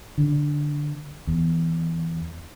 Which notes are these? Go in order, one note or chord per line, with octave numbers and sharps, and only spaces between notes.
D3
E2